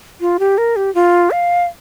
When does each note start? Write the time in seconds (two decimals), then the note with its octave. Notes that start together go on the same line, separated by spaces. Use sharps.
0.21 F4
0.39 G4
0.58 A#4
0.76 G4
0.95 F4
1.31 F5